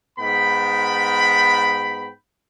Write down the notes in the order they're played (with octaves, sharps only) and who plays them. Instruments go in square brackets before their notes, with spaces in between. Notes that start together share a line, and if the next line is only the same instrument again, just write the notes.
[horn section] G#2 B3 G5 B5